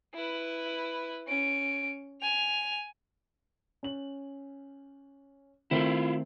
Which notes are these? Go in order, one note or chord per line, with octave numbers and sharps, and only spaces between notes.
E4 B4
C#4 D7
G#5 F7
C#4 F#7
D#3 A3 C4 E4 F4